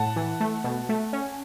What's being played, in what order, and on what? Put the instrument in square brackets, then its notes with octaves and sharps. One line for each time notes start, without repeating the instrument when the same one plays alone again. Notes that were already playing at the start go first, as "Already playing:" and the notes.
Already playing: [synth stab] A2 [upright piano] F#5 A5
[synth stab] E3
A3
B2
A3
C#4